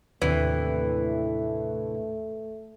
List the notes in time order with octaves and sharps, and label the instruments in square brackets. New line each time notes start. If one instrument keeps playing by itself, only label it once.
[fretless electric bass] D#2 D#3 [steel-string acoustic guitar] A2 C3 D4 [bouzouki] E3 [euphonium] A3